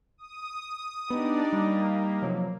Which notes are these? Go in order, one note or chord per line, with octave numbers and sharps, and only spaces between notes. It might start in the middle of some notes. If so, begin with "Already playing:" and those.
D#6
B3 D4 D#4 G4 D5
G3 A#3
C3 F3 F#3